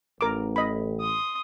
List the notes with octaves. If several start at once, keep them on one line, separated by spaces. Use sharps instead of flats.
A1 A#4 D6
D#5 B5
C6 D#6